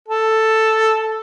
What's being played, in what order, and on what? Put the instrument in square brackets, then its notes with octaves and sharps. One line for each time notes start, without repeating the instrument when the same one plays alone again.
[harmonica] A4